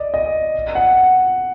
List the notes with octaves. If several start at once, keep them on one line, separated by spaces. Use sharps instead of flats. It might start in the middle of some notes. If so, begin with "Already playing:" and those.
Already playing: D5 D#5
D#5
F#5